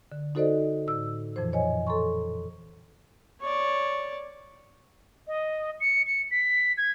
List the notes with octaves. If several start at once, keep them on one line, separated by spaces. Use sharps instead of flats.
D3
D#4 F#4 A4 C5 D5 D#5
A2 E6
F2 A#2 E3 F3 C5
C5 C#5 D#5 G#5
A4 A#5 C6 C#6
C#5 D5
D#5
C#7
C#7
B6
G#6